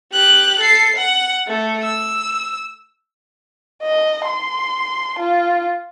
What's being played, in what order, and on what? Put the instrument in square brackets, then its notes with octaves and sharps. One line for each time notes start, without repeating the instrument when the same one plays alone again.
[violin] G4 F#6
A4 C7
F#5
A3
E6
[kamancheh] D#5
C6
F4